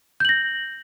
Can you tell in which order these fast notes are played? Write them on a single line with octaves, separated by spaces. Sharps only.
G6 F#7 A#6